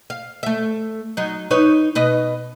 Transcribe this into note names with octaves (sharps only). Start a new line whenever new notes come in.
F5
A3 E5
F#3 D#4
D#4 B4 C#5
B2 B4 D#5